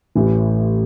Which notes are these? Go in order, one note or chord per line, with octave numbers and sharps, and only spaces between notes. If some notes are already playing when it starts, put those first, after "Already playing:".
A1 A2 E3